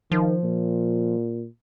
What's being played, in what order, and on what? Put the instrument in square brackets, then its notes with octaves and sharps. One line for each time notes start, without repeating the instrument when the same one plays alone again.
[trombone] D#3 [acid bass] F3
[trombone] A#2